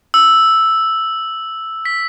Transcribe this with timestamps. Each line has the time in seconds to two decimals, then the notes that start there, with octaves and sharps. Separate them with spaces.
0.14 E6
1.85 B6